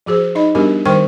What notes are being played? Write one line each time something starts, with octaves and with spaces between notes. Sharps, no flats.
F3 F#4 G#4 C5
D#4 D#5 B5
G3 B3 D4 F#4 G4 A#4
D#3 G3 A#4 C5 G5 C#6